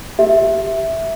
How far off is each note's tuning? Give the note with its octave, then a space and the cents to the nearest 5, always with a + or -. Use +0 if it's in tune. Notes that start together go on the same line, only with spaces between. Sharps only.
G4 +0 E5 +0